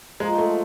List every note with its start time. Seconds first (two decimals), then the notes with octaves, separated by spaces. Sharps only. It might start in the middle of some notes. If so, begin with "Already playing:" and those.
0.20 F3 G#3 A#3 D#4
0.38 A3